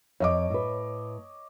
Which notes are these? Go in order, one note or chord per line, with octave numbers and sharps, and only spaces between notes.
F2 C#5 D#5 D6
A2 B4